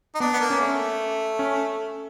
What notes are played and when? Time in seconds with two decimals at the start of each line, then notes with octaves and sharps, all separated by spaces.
0.15 D#4
0.20 B3 D4
0.33 B3
0.40 A#3
0.50 C#4
0.60 A3
1.39 C#4